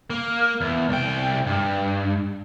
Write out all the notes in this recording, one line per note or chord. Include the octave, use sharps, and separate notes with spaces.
A#3
E2
C2 G5
G2